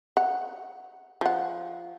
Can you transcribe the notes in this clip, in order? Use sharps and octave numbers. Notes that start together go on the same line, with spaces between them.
F#5
F3 F#5